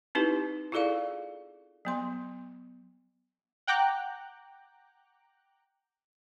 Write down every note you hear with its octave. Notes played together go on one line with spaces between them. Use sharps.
C4 D#4 E4 G4 B4
E4 F4 G#4 A4 D5 F5
F#3 B3 C6
F#5 G5 A#5 D6 F#6